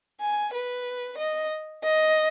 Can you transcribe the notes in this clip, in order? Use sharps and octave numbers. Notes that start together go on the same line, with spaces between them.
G#5
B4
D#5
D#5